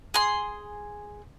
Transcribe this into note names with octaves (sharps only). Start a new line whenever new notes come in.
G#4 C6